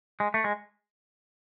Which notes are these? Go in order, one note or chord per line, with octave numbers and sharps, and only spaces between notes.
G#3
A3
G#3